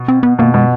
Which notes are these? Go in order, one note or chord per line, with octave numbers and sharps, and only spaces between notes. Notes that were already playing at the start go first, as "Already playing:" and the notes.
Already playing: B2
C4
B3
B2 A#3
B2 G#3